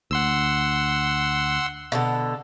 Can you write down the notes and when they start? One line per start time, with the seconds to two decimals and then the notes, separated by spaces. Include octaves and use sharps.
0.11 D2 F#5 C6 E6
1.92 B2 D3 A4